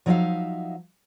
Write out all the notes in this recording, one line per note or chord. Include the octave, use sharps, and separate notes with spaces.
F3 F#3 D#4 D5 E5 F5